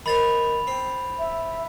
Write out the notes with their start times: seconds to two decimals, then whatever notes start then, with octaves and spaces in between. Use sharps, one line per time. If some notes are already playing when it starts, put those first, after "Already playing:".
0.06 D#3 C5 B5 A6 F7
0.67 C4
1.19 E5